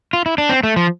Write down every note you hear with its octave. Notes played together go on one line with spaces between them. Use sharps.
F4
E4
D4
C4
A3
F3